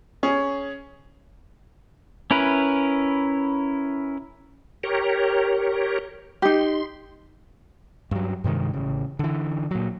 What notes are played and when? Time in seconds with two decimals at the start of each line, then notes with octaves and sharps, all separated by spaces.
0.23 C#4 G#4
2.31 C#4 E4 A#4 B4
4.83 G4 A#4 C#5
6.42 D#4 G4 C6
8.11 G2 F#3
8.44 G2 C3 D#3 G#3
8.74 A1 C#3
9.19 D3 E3
9.71 A#2 F#3